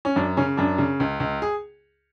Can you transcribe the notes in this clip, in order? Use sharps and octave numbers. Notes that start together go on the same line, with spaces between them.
C#4
F#2 D4
C#3 C#4
F#2 D4
C#3
C#2
C#2
G#4